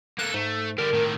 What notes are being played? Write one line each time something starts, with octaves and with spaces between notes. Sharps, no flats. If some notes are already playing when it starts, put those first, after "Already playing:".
A#3 A4 F#6
G#2 A3
D3 G3 A#4
A2 D#3